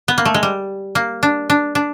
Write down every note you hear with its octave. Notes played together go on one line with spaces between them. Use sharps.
B3
A#3
A3
G#3
G3
A#3
D4
D4
D4